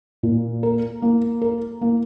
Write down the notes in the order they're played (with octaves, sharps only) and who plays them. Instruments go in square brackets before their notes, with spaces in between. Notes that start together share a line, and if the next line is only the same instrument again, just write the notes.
[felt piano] A#2
A#4
A#3
A#4
A#3